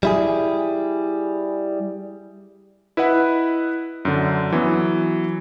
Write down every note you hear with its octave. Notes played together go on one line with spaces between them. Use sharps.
G3 E4 G#4
E4 B4 D#5 F#5
F#2 D3
E3 F#3 B3